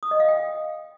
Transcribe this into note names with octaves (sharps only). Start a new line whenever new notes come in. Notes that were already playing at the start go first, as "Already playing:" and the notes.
D#6
D#5
F5
G5